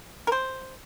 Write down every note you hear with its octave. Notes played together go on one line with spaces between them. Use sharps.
A#4
C5